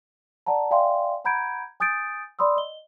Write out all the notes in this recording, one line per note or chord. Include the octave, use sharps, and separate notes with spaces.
D5 F#5 A5 A#5
D5 E5 F5 G5 G#5 C6
F#5 A#5 B5 G6 G#6 D7
G#5 D#6 G6 A6 D7
D5 B5 C6 D#6 E6
D#5 G7